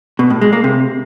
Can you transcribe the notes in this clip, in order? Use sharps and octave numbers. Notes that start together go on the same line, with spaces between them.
B2
A2
G#3
A#3
C3